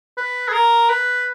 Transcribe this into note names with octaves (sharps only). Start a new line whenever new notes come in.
B4
G#4
A#4
B4